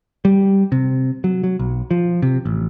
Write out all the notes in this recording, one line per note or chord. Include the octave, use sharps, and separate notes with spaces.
G3
C3
F#3
F#3
B1
F3
C3
A1